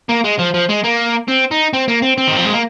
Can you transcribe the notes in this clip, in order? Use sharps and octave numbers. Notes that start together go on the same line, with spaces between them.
A#3
G#3
F3
F3
G#3
A#3
C4
D#4
C4
A#3
C4
C4
D#3
F3
G#3
A#3